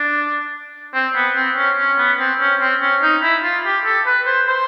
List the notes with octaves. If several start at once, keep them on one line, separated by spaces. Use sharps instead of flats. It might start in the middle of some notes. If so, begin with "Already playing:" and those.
Already playing: D4
C4
B3
C4
C#4
C#4
B3
C4
C#4
C4
C#4
D#4
E4
F4
G4
A4
B4
C5
C5